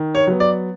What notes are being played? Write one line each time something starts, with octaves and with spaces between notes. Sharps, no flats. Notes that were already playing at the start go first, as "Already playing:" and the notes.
Already playing: D#3
C#5
F#3 B3
D5